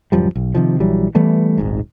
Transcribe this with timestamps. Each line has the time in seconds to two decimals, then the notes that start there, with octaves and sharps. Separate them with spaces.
0.12 D1 F#2 F3 G3
0.35 B1
0.55 C3 D#3 F3
0.80 A#1 E3 F#3 G3
1.15 E3 G3 A3 B3
1.58 D#1 G#1 G#2